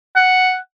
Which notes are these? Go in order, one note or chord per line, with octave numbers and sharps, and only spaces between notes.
F#5